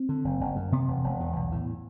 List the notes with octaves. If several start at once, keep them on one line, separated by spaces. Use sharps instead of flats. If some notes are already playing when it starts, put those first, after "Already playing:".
Already playing: C4
D3
F#1
F#1
F#2
C3 B3
E1
E1
E2
B1
A2